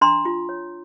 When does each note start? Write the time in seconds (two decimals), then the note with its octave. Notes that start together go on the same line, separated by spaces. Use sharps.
0.01 D4 A#5 C6
0.25 F4
0.49 C#5